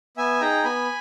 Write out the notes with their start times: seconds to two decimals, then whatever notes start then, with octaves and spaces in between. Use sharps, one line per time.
0.17 B3 E5 G#5
0.41 D#4 G#4 G5 A#5
0.64 B3 G#5 B5